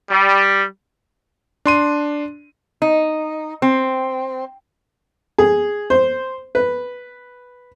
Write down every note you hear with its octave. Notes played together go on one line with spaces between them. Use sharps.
G3
D4 C6 D#7
D#4
C4
G#4
C5
B4